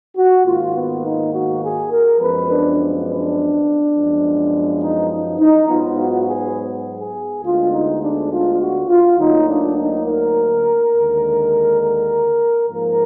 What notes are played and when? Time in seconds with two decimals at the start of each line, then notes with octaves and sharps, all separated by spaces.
0.17 F#4
0.45 G#2 D#3 A#3 F4
0.74 B3
1.04 D#4
1.32 F#4
1.62 G#4
1.91 A#4
2.19 F#2 F3 G#3 B3 B4
2.49 D4
3.07 D4
3.94 F#2 F3 G#3 B3
4.81 D#4
5.10 D#4
5.39 D#4
5.68 G#2 F#3 B3 F4
5.98 F#4
6.27 G#4
7.00 G#4
7.43 D2 D3 G#3 B3 F4
7.72 D#4
8.02 D4
8.31 F4
8.59 F#4
8.89 F4
9.18 D2 D3 F#3 A#3 D#4
9.46 D4
9.76 D#4
10.05 A#4
10.93 D#2 D3 G#3
11.80 A#4
12.68 G#2 F3 A#3 A#4